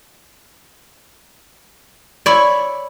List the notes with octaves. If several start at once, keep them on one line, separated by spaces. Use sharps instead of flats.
E4 C#5 D5